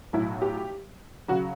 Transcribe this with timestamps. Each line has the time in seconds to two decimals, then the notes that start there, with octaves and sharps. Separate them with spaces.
0.13 B1 A2 F#3 E4
0.42 G4
1.28 C#3 F#3 F#4